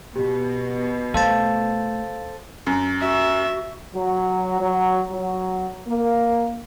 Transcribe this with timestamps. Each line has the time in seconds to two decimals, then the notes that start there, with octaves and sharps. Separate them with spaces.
0.16 B2 G4
1.14 A3 A4 C5 F5 A5
2.67 F#2
3.01 F#4 E5
3.95 F#3
4.61 F#3
5.12 F#3
5.87 A#3